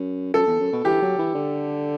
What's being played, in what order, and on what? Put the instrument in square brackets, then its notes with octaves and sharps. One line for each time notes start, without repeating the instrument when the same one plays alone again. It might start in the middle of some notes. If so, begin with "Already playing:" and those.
Already playing: [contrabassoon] F#2
[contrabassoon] F#2 [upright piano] A4
[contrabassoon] E2
F#2
B2
[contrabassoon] E3 [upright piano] G4
[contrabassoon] F#3
E3
D3